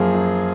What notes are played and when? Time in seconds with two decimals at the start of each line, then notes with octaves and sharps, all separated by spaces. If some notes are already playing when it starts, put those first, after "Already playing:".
Already playing: F#2 F3 A#3 F4 G#4
0.15 F#2